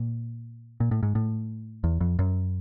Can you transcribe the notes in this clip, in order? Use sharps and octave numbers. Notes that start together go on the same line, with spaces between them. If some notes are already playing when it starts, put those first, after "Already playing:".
Already playing: A#2
A#2
A2
G#2
A2
E2
F2
F#2